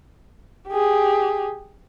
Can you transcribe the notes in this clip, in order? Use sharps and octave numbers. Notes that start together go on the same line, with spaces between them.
G4 G#4